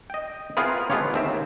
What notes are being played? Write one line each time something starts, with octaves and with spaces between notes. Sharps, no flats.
D#5 G5
B3 C4 E4 F4 G#4 A#4
G#3 A3 B3 F4 G4 C#5
D#2 C4 E5